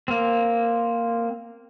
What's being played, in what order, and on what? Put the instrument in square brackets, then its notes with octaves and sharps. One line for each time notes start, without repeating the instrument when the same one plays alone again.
[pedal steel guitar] A#3 C4